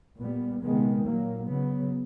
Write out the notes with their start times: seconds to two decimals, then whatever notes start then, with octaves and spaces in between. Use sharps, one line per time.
0.19 A#2 G3 B3
0.62 C3 D#3 G#3 B3
1.05 A#2 F#3 A#3
1.48 C#3 F#3 B3